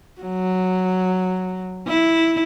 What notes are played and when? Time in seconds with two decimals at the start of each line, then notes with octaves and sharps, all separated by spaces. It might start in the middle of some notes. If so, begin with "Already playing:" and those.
0.21 F#3
1.87 E4